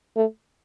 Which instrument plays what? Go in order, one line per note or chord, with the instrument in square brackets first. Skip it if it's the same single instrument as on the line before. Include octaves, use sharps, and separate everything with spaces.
[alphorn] A3